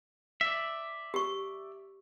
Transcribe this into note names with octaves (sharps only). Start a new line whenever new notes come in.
D5 E5
G4 C#6